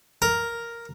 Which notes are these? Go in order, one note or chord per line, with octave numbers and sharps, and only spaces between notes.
A#4